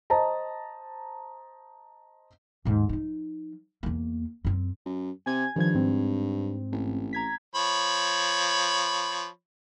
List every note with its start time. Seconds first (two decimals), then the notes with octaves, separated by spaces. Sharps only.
0.10 C5 D#5 A5 A#5
2.65 D#2 G#2
2.89 F3 D#4
3.83 E2 A#3
4.45 F#2 C4
4.86 F#2
5.26 C3 G#5 G#6
5.56 G2 D#3 F3 G#6
5.74 G#2 C4
6.72 A1
7.13 A#5 G#6 B6
7.56 F3 C#5 B5